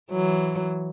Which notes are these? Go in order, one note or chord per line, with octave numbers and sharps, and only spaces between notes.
E3 F#3